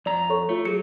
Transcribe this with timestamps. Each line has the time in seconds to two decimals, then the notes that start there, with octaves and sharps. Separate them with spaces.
0.06 F2 D5 A#5
0.30 A4 C#5 C#6
0.49 A3 F4 C#5
0.65 F#3 G#4 C#7